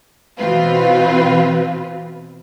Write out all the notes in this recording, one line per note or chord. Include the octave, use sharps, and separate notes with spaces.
B2 E3 C4 F4 B4